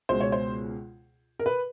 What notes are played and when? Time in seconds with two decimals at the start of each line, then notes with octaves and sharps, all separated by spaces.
0.09 C#2 B2 G#3 C5
0.21 C#5
0.32 C5
1.39 A#4
1.46 B4